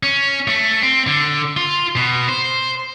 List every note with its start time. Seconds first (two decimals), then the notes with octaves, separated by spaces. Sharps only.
0.03 C#4
0.48 A3
0.82 C4
1.07 D3
1.57 F4
1.96 B2
2.29 C5